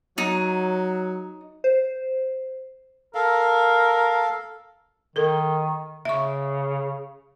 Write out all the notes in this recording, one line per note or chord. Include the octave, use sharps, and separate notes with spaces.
F#3 D#4
C5
A4 A#4 F5
D#3 A4 A#4
C#3 E5 C#6